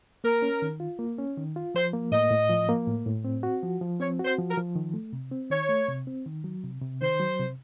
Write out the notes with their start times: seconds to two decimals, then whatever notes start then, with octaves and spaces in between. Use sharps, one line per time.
0.24 A#3 A#4
0.42 C#4
0.62 D#3
0.80 F4
0.99 A#3
1.18 C#4
1.37 D#3
1.56 F4
1.74 F3 C5
1.93 A#3
2.12 A2 D#5
2.31 A2
2.50 F3
2.69 A#3
2.87 A2
3.06 A2
3.25 C4
3.43 F#4
3.63 F3
3.81 F3
4.00 C4 C#5
4.19 F#4
4.25 C5
4.38 F3
4.50 A#4
4.57 F3
4.76 D#3
4.94 A3
5.13 C3
5.32 C4
5.50 D#3 C#5
5.69 A3
5.88 C3
6.07 C4
6.26 D#3
6.44 F#3
6.64 C3
6.82 C3
7.01 D#3 C5
7.20 F#3
7.39 C3